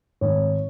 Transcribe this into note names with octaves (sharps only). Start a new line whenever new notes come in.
G#1 C#5